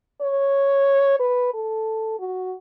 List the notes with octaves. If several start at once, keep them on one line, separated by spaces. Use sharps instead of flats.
C#5
B4
A4
F#4